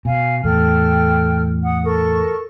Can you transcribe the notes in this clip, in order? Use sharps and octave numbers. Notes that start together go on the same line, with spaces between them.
B2 F5 G#5
E2 A2 A4 G5 F6
F#5 D#6
A4 A#4 C#6